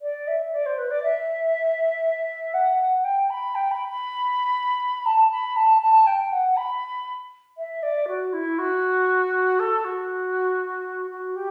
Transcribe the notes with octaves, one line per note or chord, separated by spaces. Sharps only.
D5
E5
D5
C5
B4
D5
E5
F#5
G5
B5
G5
B5
B5
A5
B5
A5
A5
G5
F#5
B5
E5
D5
F#4
E4
F#4
A4
F#4
F#4
G4